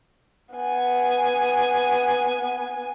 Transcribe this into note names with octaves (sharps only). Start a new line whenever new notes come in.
B3 G#5